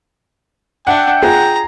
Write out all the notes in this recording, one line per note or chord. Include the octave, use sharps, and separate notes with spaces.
D4 E5 F#5 G5
F4 G#4 A#5